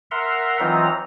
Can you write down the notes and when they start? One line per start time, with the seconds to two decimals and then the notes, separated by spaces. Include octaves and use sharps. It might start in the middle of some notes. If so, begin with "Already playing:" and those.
0.11 A#4 E5 F#5 A#5 C6
0.60 E3 F#3 C4 D#4 F4 A#5